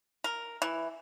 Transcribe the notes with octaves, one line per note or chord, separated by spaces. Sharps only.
A#4
E3